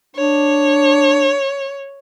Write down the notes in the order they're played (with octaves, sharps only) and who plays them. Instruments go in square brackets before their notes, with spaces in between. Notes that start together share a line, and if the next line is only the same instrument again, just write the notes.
[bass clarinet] D4 [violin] C#5